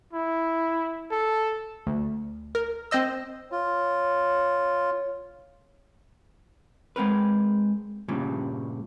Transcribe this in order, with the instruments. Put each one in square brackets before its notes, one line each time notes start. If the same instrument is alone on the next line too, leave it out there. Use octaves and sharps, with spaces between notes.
[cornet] E4
A4
[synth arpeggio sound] D2
A#4
C4 C5 D#5 E6
[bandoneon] F4 [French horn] C#5
[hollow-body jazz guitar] G#3 C4 A#4 B4
G2 A#2 C#3 G3